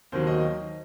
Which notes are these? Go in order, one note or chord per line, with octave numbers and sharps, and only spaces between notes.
D#2 D#3 F#3 C5
D#5